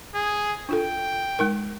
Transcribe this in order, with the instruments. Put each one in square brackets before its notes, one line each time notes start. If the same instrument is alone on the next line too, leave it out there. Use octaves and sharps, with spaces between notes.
[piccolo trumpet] G#4
[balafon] D4 F4 A4 [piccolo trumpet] G5
[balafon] G#3 D#4 A#4